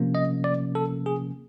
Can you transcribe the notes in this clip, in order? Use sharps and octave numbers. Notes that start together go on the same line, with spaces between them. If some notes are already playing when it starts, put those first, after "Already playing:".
Already playing: C3 F3 A#3 C#4
D#5
D5
A4
G#4